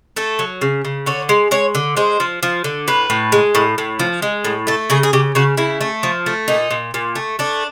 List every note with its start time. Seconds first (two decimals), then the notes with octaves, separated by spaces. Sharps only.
0.16 A3 A4
0.39 F#3
0.62 C#3
0.85 C#3
1.06 D3 C#5
1.29 G#3
1.51 G#3 C#5
1.75 D3
1.97 G#3 C5
2.20 F3
2.43 F3
2.64 D3
2.88 A2 B4
3.10 A2
3.32 G#3
3.55 A2
3.78 A2
4.00 F3
4.22 G#3
4.45 A2
4.67 A3 A4
4.90 C#3 G#4
5.03 G#4
5.13 C#3 G4
5.35 C#3 F#4
5.57 C#3 E4
5.81 A3
6.03 F3
6.26 A3
6.48 A#2 D#4
6.71 A#2
6.94 A#2
7.15 A3
7.39 A3 D4